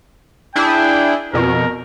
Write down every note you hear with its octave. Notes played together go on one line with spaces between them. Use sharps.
D4 E4 G#4 G5
F2 B2 A#4